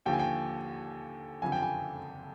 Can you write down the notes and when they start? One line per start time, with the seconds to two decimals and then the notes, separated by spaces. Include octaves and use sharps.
0.05 D#2 D3 F3 G5
0.13 G#5
0.19 G5
1.42 F#1 F2 D3 F3 G#5
1.52 G5
1.62 G#5